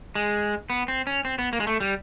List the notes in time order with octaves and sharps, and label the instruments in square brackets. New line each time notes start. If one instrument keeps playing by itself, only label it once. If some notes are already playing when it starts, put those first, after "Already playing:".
[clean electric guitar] G#3
B3
C4
C#4
C4
B3
A#3
G#3
A3
G3